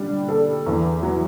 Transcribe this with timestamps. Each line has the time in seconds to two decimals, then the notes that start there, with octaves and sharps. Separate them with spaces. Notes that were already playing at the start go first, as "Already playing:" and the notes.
Already playing: D3 G3 D4
0.29 A4
0.66 E2
1.03 F#3